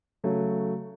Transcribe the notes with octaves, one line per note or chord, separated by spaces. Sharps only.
C#3 F#3 A3 F#4